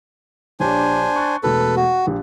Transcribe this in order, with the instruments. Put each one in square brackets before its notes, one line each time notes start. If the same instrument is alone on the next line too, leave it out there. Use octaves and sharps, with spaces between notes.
[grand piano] A#1 G4 C#5 [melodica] D4 C5 G#5
[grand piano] C#6 F#6 A6
[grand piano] E1 B2 A3 [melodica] A4 B4
[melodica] F#4
[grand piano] A#1 G4